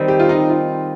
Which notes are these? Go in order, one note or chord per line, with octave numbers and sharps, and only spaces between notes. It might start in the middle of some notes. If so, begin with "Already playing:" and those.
Already playing: D#3 G3 C4
G4
F4
D#4
F4